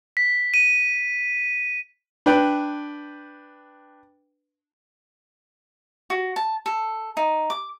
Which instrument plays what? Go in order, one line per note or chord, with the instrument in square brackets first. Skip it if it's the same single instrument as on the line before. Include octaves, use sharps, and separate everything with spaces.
[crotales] B6
D#7
[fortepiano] D4 B4 G5
[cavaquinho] F#4
A5
A4
D#4
D6